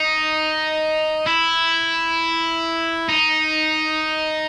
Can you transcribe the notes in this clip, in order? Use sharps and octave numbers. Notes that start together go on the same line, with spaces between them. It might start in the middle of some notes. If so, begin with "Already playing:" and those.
Already playing: D#4
E4
D#4